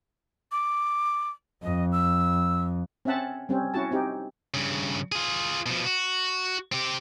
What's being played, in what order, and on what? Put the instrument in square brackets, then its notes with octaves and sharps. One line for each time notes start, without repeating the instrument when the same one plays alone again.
[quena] D6
[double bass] F2 [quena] D#5
[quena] E6
[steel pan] C4 C#4 E5 F#5 A5
G3 C4 C#4
C#4 E4 F#4 A5
C4 D#4 G4
[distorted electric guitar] G2 C#3
F4 G#4
B2 F3
F#4
C4 G4